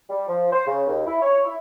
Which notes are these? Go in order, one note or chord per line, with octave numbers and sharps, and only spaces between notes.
G3
F3
C5
C#3
D#2
E4
C#5
E4